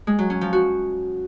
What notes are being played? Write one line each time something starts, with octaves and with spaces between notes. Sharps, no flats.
G#3
F#3
C#4
F3
F#4